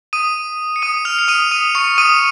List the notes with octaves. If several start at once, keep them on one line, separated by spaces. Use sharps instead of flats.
D#6 D#7
C#7
D#6 D#7
F6 F7
C#7
D#6 D#7
D#6 D#7
C#6 C#7
D#6 D#7